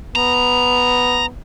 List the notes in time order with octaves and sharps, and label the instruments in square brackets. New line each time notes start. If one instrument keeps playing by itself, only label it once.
[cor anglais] B3 [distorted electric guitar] A#5